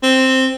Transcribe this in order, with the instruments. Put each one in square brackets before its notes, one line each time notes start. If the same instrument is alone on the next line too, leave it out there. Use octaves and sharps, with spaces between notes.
[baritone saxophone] C4